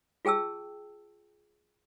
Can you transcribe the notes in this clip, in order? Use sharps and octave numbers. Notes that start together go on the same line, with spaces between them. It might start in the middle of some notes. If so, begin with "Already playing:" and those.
F4 G#4 G5 A5 E6